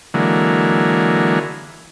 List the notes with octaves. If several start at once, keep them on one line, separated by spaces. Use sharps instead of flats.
D3 E3 F#3 G#3 A#3